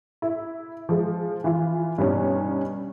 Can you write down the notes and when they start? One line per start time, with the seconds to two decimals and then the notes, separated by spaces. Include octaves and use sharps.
0.22 E4
0.89 F3 G#3
1.44 E3 F4
1.98 G2 B2 G3 C#4 D#4